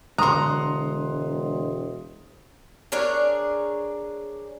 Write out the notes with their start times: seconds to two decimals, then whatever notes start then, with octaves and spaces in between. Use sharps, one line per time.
0.18 E1 D3 G#3 D4 F#5 A#5 C6 D#6
2.92 D4 G#4 A#4 C#5